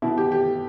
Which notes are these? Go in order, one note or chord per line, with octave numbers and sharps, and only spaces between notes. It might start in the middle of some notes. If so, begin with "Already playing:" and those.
B2 E4
G4
G4